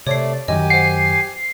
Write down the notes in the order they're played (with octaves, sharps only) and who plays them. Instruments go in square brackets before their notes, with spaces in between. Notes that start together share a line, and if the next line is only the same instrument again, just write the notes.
[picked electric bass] C3 [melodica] A3 D5 [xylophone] C#5 C7
[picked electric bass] F#2 D#3 F#3 [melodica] G4 G#5 [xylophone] D#5
[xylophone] C5 F#5 [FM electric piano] C7